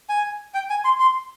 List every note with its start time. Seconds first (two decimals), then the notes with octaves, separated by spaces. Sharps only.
0.09 G#5
0.54 G5
0.70 G#5
0.85 C6
1.00 C6